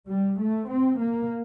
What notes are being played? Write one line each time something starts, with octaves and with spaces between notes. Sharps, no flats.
G3
A3
C4
A#3